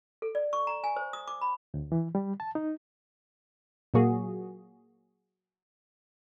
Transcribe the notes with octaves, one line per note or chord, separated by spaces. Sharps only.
A4
D5
C#6
A#5
G#5
C5
D#6
D6
B5
D2
E3
G3
A5
D#4
A#2 F#3 A#3 F#4 G#4